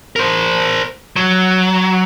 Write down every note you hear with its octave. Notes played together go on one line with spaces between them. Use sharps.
A#4 C5
F#3